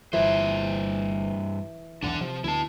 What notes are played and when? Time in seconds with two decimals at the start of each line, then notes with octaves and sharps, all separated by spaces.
0.13 G1 G2 E3 F3 C5
2.03 B1 E2 G#2 D4 F#5
2.21 C3 F3
2.44 D2 B2 E4 A5